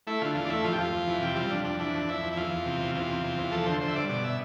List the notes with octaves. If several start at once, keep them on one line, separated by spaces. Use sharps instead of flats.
A3 E4
D3 F4
E2 F4
D4
A3 E4
F2 F4
G4
F2 F4
F2
E3
C3 G4
G3 F4
F2 D4
F2 D4
E3 D4
F2
F2 E4
F2
E4
E2 F4
E2
C3
E2
E2 F4
C3
E2
E2
F3 A4
D3 C5
D3 C5
E5
G2 D5
B2 D5
E5